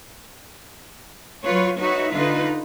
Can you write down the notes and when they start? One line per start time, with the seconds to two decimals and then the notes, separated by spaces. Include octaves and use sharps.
1.46 F#3 F4 B4 C#5
1.80 D#4 F#4 B4 C#5 E5
2.13 D3 D#4 F4 B4